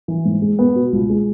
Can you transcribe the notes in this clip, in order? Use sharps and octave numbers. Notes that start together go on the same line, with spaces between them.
E3
G#2
G#3
B3
B2
C#2
G#3